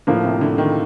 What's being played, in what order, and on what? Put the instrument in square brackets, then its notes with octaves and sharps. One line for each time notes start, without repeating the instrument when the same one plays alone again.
[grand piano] A2 F3 A#3 [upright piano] D3
[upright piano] C3
D3
D#3